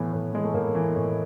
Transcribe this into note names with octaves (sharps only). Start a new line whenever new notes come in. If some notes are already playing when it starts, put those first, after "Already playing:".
Already playing: A2 E3 B3
A2
E3 G#3
A3
A2 A#3
E3
A2